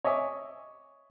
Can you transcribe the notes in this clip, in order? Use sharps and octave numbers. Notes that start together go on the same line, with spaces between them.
C#5 D#5 E5 G#5 D6